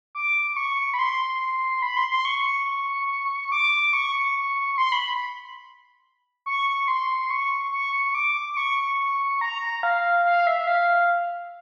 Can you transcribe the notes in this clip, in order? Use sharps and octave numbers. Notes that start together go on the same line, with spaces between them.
D6
C#6
B5
C6
B5
C6
C6
C#6
D6
C#6
C6
B5
C#6
C6
C#6
C#6
D6
D6
C#6
A#5
F5
F5
E5
F5